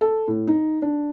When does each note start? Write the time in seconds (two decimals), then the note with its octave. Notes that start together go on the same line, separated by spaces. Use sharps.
0.01 A4
0.28 A2
0.47 D#4
0.82 D4